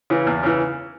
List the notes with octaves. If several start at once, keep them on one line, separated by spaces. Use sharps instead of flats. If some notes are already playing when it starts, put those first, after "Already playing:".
C#3 E3
E2
C#3 E3